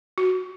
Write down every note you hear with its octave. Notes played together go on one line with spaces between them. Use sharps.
F#4